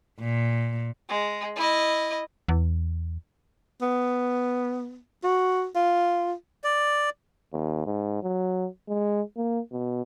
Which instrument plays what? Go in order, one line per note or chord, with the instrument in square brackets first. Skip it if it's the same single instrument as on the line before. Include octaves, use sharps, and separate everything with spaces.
[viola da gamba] A#2
[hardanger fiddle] G#3
E4 D#5
[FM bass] E2
[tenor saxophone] B3
F#4
F4
[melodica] D5
[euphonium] D#2
G#2
F#3
G#3
A#3
B2